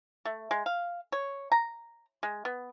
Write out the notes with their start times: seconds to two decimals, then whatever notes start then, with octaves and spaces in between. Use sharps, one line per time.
0.25 A3
0.51 G#3
0.66 F5
1.12 C#5
1.52 A#5
2.23 G#3
2.45 B3